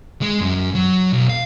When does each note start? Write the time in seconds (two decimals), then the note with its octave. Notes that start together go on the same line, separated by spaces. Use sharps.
0.22 G#3
0.41 F#2
0.75 F#3
1.13 B1
1.29 F5